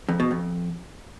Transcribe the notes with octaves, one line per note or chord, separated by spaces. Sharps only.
F2
B2
F2